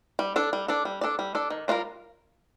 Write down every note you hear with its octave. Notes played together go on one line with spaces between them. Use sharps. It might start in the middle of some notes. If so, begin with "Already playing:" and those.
G3
D4 A4 D5
G3
D4 A4 D5
G3
D4 A4 D5
G3
D4 A4 D5
D#3
G3 D4 F4 A#4